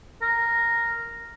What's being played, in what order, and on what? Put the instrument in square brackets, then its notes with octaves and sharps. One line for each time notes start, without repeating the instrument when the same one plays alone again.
[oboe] A#4